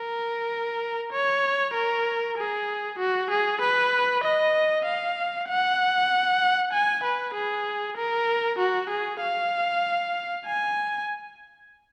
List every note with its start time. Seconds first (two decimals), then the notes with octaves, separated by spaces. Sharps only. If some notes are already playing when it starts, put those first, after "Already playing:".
Already playing: A#4
1.12 C#5
1.75 A#4
2.38 G#4
2.99 F#4
3.31 G#4
3.61 B4
4.24 D#5
4.85 F5
5.49 F#5
6.73 G#5
7.04 B4
7.34 G#4
7.97 A#4
8.59 F#4
8.90 G#4
9.21 F5
10.46 G#5